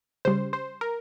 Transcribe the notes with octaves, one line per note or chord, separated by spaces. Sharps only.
C#3 G3 C5
C5
A#4